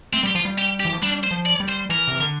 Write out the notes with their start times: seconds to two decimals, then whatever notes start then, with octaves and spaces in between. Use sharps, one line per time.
0.13 A3 C4
0.23 G3 G4
0.35 F3 F4
0.45 G3
0.58 G4
0.80 G4
0.85 E3
0.93 F3
1.02 G3 D4
1.23 C5
1.31 F3
1.45 D5
1.60 G3
1.68 C5
1.89 E3 A#4
2.07 C3
2.20 D3